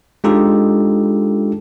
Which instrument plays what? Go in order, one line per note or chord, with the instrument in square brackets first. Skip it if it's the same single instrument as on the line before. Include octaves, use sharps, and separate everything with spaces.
[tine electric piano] G#3 D4 D#4 F4 G4 A4